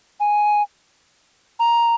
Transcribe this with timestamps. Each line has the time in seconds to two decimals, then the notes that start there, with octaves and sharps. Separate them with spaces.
0.20 G#5
1.60 A#5